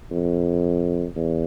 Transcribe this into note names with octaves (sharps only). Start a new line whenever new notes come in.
F2
E2